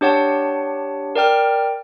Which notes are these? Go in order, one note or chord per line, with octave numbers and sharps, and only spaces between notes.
D4 G4 C#5 F#5 A5
A#4 D5 G5 F6